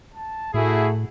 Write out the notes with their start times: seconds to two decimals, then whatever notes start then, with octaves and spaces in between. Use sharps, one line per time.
0.14 A5
0.54 A2 A3 E4 F#4 G#4